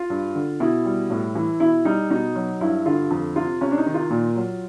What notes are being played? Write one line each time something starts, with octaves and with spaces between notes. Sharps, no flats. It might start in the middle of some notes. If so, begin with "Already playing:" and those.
Already playing: F4
G2
D3
B2 E4
G3
A2
E3
B2 E4
G3 D#4
B2 D#4
F#3
G2 E4
D3 F4
F2
C3 F4
C3 C#4
D4
D#4
D#3
F4
A#2
F#3